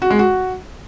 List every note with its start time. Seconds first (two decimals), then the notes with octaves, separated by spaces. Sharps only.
0.02 F#4
0.10 G#3
0.19 F#4